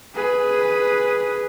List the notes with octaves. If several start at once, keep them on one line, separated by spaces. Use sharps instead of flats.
G#4 B4